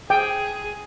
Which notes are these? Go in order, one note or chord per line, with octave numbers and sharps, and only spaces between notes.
G#4 G5